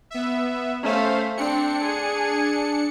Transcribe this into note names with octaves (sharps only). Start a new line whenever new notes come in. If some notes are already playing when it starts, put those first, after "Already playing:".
B3 E5
A3 C#4 C5 F5
C4 D4 C#7
G#4